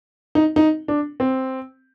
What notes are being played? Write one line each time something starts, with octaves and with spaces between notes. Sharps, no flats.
D#4
D#4
D4
C4